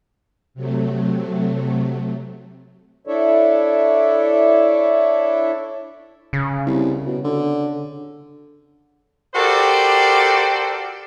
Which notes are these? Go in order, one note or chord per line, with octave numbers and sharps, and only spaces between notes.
C3 F#3 A3
D4 E4 A4 C#5 D5 E5
C#3
C2
B2
D3
F#4 G4 A4 A#4 C5 D5